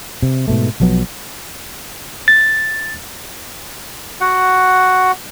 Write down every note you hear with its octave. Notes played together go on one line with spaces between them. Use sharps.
C3
G#2 B2 A3
B1 F3 F#3 B3
A6
F#4 F#5